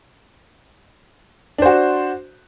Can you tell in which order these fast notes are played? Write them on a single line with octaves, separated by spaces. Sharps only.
D4 C5 F#4